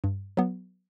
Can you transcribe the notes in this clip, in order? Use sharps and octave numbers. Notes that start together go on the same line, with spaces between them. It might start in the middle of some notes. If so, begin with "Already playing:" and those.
G2
F#3 B3